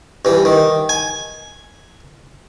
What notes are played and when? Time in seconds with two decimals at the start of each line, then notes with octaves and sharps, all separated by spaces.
0.25 G2 E3
0.45 D#3
0.89 G#5